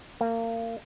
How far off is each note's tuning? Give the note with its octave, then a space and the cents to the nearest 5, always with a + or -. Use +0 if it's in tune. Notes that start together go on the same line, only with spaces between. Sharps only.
A#3 -30